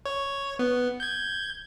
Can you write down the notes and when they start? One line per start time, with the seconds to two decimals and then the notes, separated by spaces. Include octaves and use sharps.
0.06 C#5
0.59 B3
1.00 G6 G#6